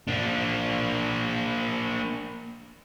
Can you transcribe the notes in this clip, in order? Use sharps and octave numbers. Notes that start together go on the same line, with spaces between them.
A#3 D4